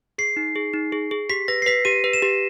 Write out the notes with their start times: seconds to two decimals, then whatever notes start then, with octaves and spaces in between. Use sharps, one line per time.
0.18 G#4 C7
0.37 D#4
0.56 G#4
0.73 D#4
0.92 G#4
1.11 G#4
1.30 G4 B6
1.48 B4 A#6
1.62 C7
1.66 B4 B6
1.85 G4 D#7
2.04 B4
2.13 E7
2.22 G4